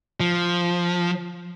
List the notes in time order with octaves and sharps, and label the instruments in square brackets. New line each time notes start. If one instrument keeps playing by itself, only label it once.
[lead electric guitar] F3